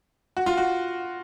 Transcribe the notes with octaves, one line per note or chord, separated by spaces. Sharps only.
F#4
F4
F#4